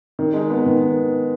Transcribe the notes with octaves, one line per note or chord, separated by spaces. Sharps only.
D#3
G#3
B3
D#3